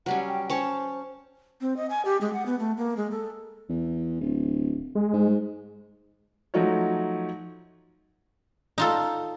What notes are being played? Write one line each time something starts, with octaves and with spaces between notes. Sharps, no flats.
F#3 G3 C#4 F#5
G5
C#4 C5 C#5 A5
C4
D#5
G#5
G4
G#3
F#5
B3
A3
A#3
G#3
A4
E2
D1
G#3
G#2
F3 F#3 A3 D#4 F#4 C#5
D#4 F4 A4